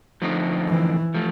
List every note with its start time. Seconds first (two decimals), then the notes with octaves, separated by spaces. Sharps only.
0.22 D3 F3 A3 C4 D#4
0.68 E3
1.14 F3 A3